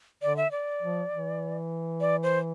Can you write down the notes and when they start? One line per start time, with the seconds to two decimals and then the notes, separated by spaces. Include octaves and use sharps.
0.22 D3 D5
0.37 E5
0.51 D5
0.82 F3
1.11 E3
2.01 D5
2.23 C5